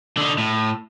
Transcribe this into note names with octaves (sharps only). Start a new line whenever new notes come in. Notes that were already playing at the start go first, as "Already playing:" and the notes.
D3 D#4
A2